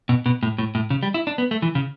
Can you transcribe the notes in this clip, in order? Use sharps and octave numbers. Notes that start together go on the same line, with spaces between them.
B2
B2
A2
A2
A2
C#3
G3
E4
D4
B3
A3
E3
C#3